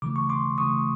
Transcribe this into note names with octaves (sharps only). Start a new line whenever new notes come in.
C#3 E3 A3 D6
C#6
C6 D6
C#3 E3 A3 C#6 D#6